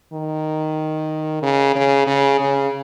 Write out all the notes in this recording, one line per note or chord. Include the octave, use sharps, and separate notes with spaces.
D#3
C#3
C#3
C#3
C#3